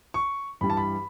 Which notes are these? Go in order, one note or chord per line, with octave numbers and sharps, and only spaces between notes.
C#6
G2 E3 G3 B5
A5
B5